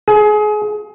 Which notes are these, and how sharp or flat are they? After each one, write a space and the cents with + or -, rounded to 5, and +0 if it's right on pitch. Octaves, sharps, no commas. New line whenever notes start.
G#4 +30